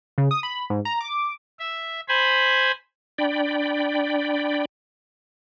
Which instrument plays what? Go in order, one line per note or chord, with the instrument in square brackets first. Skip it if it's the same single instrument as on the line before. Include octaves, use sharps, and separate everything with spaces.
[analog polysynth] C#3
D#6
B5
G#2
A#5
D6
[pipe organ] E5
C5 G#5 B5
[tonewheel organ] D4 D5 G5 B5